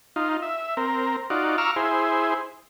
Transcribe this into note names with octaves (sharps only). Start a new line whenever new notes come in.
D#4 F4
E5
C4 A#4
D#4 F4 F#4 D5
F5 A#5 C#6 D6 E6 F6
E4 G#4 C5